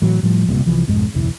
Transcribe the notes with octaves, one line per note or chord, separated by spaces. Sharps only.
A2 E3 F#3
A2 F3 G3
F#1 C2 A#2
C2 E3 F3
B1 F2 G#2 G#3
F#1 B1 E2 E3